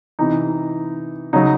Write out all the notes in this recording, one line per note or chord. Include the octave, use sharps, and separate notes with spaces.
C3 E3 D#4
C#3 F#3 D#4